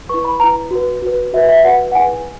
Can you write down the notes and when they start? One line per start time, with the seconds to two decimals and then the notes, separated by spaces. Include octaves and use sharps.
0.09 E4 B4 C#6
0.25 B5
0.40 E4 B4 A#5
0.71 F#4 B4
1.02 F#4 B4
1.33 F#4 B4 E5
1.49 E5
1.64 F#4 B4 F#5
1.92 F#5
1.95 E4 G#4 B4 G#5